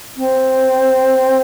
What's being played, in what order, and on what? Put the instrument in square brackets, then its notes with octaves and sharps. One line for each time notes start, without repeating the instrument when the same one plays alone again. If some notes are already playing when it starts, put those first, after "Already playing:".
[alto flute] C4